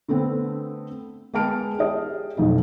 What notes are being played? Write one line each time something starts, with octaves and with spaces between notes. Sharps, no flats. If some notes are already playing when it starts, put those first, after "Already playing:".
D3 A3 B3 C4
G#3 B3 G5 A5 F6 D7
G4 G#4 D#5
B1 F2 B2 D#4